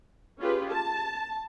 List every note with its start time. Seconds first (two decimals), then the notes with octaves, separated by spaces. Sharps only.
0.40 C#4 F4 G4 G#4 B4
0.70 A5